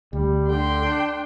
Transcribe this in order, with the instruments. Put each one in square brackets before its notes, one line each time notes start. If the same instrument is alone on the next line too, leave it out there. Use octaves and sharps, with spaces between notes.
[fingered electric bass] D2 [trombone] G3
[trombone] D3 [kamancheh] G5 C6
[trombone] D4